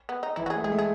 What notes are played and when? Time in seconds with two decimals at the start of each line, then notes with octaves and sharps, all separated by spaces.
0.09 B3
0.23 D#4
0.36 E3 E4
0.46 F#4
0.50 G#4
0.56 A3
0.64 G#3 G#4
0.72 A3
0.79 G#4